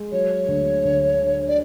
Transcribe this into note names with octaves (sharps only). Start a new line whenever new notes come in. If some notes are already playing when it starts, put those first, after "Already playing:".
Already playing: G#3
F#3 C#5
D2
D2
D3
D5